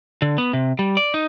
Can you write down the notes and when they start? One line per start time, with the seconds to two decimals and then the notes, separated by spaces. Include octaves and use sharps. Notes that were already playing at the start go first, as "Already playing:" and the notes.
0.22 D3
0.38 B3
0.53 C3
0.79 G3
0.97 D5
1.14 D#4